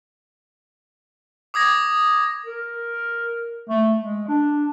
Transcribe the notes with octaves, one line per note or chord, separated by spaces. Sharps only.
D6 D#6 G#6 A#6
A#4
A3
G#3
D4